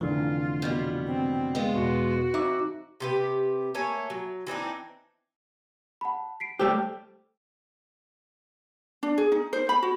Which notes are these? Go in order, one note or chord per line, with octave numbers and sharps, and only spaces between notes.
F1 D3 E3 F4
B2 G3 B3
C4
G#3 B3 F4
E2 B2 F#4
F2 D#4 E5 D6
C3 G4 B4
A3 A#3 C#5 G#5
F#3
E3 C4 D4 D#4
F#5 A5 B5
B6 C7 D7
G3 A3 G4 C5 E6
D4
G#4
D#4
C5
B5
F#4